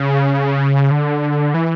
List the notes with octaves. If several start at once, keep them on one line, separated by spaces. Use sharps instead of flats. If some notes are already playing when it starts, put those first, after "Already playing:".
Already playing: C#3
D3
E3